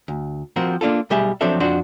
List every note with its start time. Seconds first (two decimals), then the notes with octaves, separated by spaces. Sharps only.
0.08 D2
0.56 F3 C4 F#4 A#4
0.81 A#3 D4 F4 A4
1.10 B1 G3 G4 G#4 E5
1.41 F3 F#3 C4 D4 A4 E5
1.60 F2 D4 F#4 C5